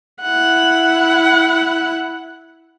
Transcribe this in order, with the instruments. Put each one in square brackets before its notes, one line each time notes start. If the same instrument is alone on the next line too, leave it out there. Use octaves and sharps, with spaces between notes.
[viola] E4 F#5